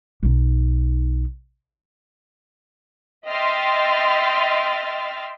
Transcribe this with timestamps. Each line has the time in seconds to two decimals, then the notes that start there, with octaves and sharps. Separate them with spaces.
0.23 B1 D#4
3.27 D#5 E5 G5 C6 F6 A6